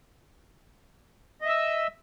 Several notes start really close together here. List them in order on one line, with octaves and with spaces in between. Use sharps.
D#5 E5 E6